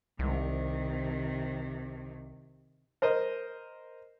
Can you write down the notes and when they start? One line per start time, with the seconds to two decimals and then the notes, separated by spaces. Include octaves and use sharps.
0.19 C2 C3 D#3
3.02 A#4 C5 D#5